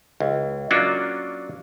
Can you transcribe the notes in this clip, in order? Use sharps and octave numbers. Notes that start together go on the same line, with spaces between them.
C#2
F#3 A#3 C#4 D4 F4 F#4